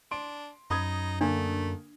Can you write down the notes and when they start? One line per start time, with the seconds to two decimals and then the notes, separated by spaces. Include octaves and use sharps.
0.11 D4 C6 D7
0.70 F#2 D#4 B5 D#6 G#6
1.21 D3 A3 A#3 D4